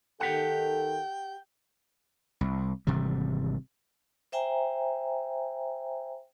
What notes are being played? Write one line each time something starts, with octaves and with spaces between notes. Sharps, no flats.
D#3 G4 A4 F#5 G5
C2
G#1 C3 E3 G3
C5 E5 G5 G#5 A#5